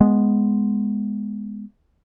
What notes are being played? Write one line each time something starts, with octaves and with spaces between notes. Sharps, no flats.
G#3 B3